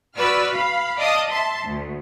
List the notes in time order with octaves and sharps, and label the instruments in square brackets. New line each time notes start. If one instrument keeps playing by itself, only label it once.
[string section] F#4 B4 D5 E6 F6
F5 B5
D5 D#5 F5 A5 D#6
E5 A5 C6
D2